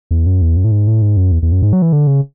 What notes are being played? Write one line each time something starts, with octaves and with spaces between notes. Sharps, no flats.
E2
F#2
E2
F#2
A2
G#2
A2
G#2
F#2
E2
E2
F#2
G#2
F#3
E3
D3
C#3